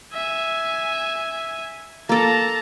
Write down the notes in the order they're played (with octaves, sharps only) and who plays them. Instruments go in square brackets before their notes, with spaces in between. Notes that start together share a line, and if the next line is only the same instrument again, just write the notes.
[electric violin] E5 G#5
[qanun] A#3 A4 [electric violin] A5 A#5